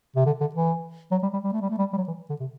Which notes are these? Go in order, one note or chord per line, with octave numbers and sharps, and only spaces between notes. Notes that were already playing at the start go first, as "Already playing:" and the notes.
C3
D3
D3
E3
F#3
G3
G3
G3
A3
G3
A3
G3
G3
F#3
E3
D3
C3